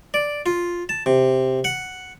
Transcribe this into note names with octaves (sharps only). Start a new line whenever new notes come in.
D5
F4
A5
C3
F#5